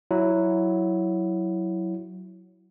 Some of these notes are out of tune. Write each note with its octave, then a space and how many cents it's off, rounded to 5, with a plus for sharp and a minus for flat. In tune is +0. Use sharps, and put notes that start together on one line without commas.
F#3 +0 E4 +0